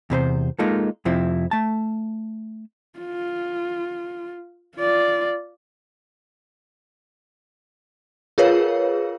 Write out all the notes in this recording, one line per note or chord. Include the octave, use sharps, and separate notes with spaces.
E2 C3 B4 C5
G#3 A#3 D#4 F4 A4
F2 C3 F3 C4 E4
A3 A5
F4
F4 D5
F4 G#4 A#4 B4 C#5 F5